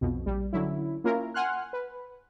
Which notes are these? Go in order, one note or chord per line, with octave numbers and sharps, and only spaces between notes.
B1 F2 B2
A#1 G3
D3 F#3 C#4 E4
A#3 C#4 E4 F4 A#4
F#5 G#5 C6 F6 F#6
B4